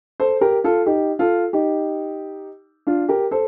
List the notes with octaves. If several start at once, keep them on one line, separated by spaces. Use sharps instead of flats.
A4 C5
G4 A#4
F4 A4
D#4 G4
F4 A4
D#4 G4
D4 F4
G4 A#4
A4 C5